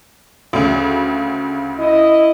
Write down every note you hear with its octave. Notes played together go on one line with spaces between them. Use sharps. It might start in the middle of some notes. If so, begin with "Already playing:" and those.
D2 C#3
E4 D#5